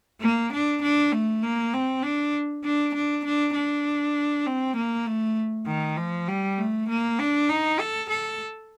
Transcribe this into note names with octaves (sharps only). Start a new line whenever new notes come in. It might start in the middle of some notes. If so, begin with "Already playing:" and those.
A#3
D4
D4
A3
A#3
C4
D4
D4
D4
D4
D4
C4
A#3
A3
D#3
F3
G3
A3
A#3
D4
D#4
A4
A4